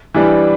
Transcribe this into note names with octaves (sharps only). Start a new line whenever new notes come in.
E3 G3 D4